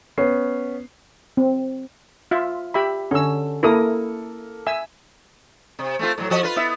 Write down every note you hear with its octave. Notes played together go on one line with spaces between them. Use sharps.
B3 C#4 C7
C4
F4 E5
G4 E5 B5
D3 C#4 E6
A#3 E4 A4 A#4 D#6
E5 G#5 E6
C3
A3 C4 F4
A2 F#3
F3 F#4 D#5
F4 B4
B3 E4 E5